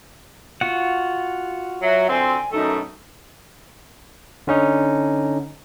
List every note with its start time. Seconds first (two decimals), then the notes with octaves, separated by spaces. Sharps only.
0.61 F4 F#4 F#5
1.82 F#3 E5
2.10 D3 C4 G#5
2.53 F#2 B2 A3 D#4
4.47 D3 C#4 D#4